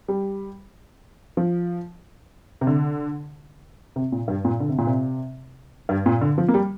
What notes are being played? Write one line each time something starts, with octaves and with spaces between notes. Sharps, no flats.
G3
F3
C3
D3
C3
A#2
G2
A#2
D3
C3
A#2
C3
G2
A#2
D3
F3
A#3
G3